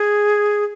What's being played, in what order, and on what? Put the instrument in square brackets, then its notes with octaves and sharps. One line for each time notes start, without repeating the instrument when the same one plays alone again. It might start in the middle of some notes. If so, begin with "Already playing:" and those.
Already playing: [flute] G#4